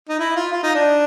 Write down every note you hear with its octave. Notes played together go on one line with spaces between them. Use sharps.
D#4
E4
F4
F4
D#4
D4